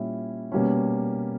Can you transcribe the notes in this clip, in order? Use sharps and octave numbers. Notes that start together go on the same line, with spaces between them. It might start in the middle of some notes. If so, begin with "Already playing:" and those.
Already playing: A#2 G3 C#4 E4
B2 G3 A#3 C#4